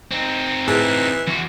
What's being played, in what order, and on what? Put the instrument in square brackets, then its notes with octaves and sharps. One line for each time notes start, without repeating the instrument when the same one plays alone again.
[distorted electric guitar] C4 D#4
[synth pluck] A2 G#4 A5 [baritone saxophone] E3
[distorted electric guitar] E2 F#4 [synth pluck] E3